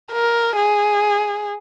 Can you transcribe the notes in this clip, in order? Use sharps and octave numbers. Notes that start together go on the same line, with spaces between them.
A#4
G#4